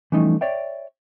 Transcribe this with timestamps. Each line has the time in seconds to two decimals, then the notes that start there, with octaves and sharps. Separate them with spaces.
0.12 E3 F3 G3 A3 C#4 D#4
0.41 C#5 D5 E5 G5